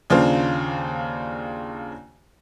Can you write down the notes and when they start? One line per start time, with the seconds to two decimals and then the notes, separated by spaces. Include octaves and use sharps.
0.10 D#2 C#3 D4 F4 C5